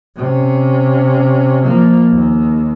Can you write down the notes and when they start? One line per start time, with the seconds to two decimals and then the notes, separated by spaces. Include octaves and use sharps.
0.16 C3 C#4
1.63 F3 A#3
2.11 D#2